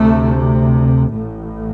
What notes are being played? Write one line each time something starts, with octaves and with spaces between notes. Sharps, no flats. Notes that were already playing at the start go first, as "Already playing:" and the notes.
Already playing: D2 C3 A3
A1 A2